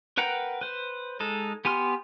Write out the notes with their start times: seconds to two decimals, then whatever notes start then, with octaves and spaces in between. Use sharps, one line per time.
0.17 A#4 B4 F#5 G5 A#5
0.61 B4 C5
1.20 G#3 D#4 A4
1.65 B3 G4 G#5 C6 F6